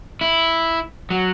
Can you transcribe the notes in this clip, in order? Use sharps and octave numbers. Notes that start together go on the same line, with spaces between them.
E4
F#3